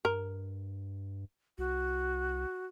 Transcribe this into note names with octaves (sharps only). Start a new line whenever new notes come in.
G2 A#4
C2 F#4